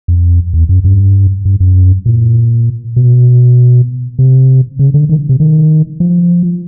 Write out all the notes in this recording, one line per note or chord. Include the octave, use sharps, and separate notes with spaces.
F2
E2
F#2
G2
G2
F#2
A#2
B2
C3
C#3
D3
D#3
C3
D#3
F3